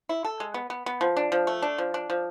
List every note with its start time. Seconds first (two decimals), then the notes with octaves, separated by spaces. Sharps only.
0.09 E4
0.25 A4
0.40 G#3
0.54 B3
0.70 B3
0.86 B3
1.01 F3
1.17 D4
1.32 F3
1.47 A3
1.62 D4
1.78 F3
1.94 D4
2.10 F3